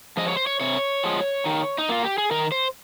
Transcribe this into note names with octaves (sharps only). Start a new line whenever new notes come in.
F3 G#3 D#5
C#5
C5
C#5
C3 C#5
F3 G#3
D#3
D#4
A#3 F4
G4
G#4
D#3 A#4
C5